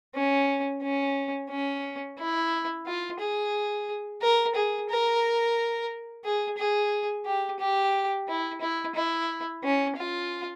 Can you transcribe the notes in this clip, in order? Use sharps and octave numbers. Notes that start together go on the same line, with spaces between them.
C#4
C#4
C#4
E4
F4
G#4
A#4
G#4
A#4
G#4
G#4
G4
G4
E4
E4
E4
C#4
F4